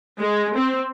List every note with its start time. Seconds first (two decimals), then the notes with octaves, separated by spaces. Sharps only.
0.19 G#3
0.56 C4